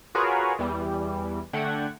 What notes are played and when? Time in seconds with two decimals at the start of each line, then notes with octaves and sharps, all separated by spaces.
0.15 F4 F#4 G#4 A#4 B4 C#5
0.59 E2 E3 G3
1.53 D3 A3 F#5 G5 G#6